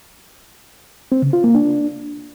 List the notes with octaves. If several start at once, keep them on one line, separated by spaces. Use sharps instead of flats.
C4
C#3
F4
A#3
D4